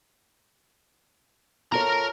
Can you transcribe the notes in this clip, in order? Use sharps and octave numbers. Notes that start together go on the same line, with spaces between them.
F4 A4 A#4 C#5 A#5